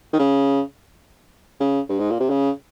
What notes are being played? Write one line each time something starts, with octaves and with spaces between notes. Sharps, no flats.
D#3
C#3
C#3
G2
G#2
A#2
C3
C#3